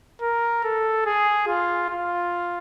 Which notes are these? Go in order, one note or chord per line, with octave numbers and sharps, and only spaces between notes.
A#4
A4
G#4
F4
F4